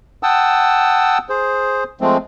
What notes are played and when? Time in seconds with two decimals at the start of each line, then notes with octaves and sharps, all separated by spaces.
0.23 F#5 G5 A5 D#6 E6
1.29 G#4 C5
2.01 F3 G#3 A3 C4